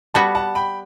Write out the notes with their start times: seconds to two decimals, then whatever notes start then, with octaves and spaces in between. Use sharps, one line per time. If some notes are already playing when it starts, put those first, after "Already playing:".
0.14 G3 B3 F#4 F#5 A5
0.35 F#5 A5
0.55 G5 B5